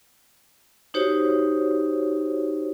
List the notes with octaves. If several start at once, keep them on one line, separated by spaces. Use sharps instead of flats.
D#4 F#4 G4 C5 C#5